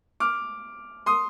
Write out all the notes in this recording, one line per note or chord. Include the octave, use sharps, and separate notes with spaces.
D6 F6
C6 D#6